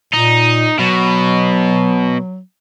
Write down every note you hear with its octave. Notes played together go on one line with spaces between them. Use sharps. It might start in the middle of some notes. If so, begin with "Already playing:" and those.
A#2 D#4
B2 F#3